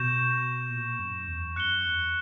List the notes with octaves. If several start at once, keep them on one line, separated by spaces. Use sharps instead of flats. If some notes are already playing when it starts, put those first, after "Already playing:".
Already playing: B2 C#6 G6 A#6 E7
A#2
F#2
E2
F#2 F#6 C#7 G7
E2